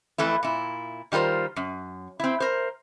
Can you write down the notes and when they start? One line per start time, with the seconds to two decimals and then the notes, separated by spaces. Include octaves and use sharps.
0.18 F2 E3 A3 E4
0.43 A#2 E4
1.12 D#3 G3 F4 A#4 C5
1.56 F#2
2.20 C4 E4
2.40 A#4 C5